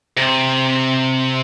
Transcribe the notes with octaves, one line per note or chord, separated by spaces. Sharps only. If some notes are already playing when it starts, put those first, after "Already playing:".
C3